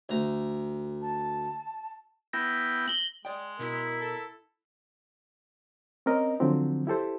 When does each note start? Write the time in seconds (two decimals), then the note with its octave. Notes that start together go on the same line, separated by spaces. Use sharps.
0.09 D2 A#5
1.02 A5
2.33 B3 E4 G5 A#6
2.88 F#7 G7
3.25 G#3 D5 G5
3.59 B2 E4 A#4
4.01 A4
6.06 C4 C#4 A#4 D#5
6.40 D3 F3 F#3 C4
6.87 E4 G4 A4 C5